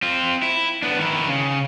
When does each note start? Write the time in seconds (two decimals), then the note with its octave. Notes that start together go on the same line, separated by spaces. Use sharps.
0.02 C4 F4
0.42 E4
0.82 B3 D4
0.97 D#3 E4
1.28 C#3